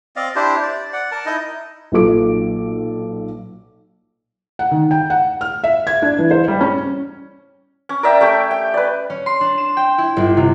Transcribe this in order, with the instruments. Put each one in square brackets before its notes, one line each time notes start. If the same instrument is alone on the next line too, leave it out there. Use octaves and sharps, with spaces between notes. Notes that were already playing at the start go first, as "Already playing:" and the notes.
[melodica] C4 D5 D#5 F5
D4 E4 G4 C5
D5
D5 F#5
A#4 A5
D#4 E4 D#5
[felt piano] B1 A#2 F4 A4 D6 D7
F#5
D#3
G5
F#5
F6
E5
G#6
D4
E3
C5
G3
C#4
[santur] C#4
A#4 D5 E5 G5
A3 C#4 G4
G5
B4 D5
[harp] C#4
C6
D4
E7
G5
E4
G1
C3